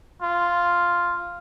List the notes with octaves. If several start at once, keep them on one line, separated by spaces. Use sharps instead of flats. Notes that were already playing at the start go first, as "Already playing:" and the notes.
F4